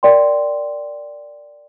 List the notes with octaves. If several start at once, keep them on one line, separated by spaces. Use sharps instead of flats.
A#4 D5 G5 C6